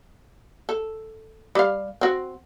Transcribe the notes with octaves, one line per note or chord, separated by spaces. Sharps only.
A4
G3 F5
C4 F#4